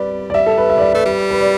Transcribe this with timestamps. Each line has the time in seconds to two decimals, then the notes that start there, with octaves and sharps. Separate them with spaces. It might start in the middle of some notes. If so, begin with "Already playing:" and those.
Already playing: G3 B4 D5
0.30 D5
0.34 G3 E5
0.46 A4
0.58 B4
0.70 E5
0.78 D5
0.82 E5
0.93 A3 B4
1.05 G3
1.31 B4
1.41 D5